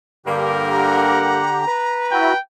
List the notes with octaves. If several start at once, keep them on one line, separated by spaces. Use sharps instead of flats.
G2 D3 A#3 G4 A#4
F#5 A#5
B4
E4 F#4 G5